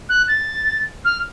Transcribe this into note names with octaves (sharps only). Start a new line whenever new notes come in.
F#6
A6
F6